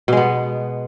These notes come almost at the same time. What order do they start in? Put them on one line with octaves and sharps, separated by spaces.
B2 G#3 B3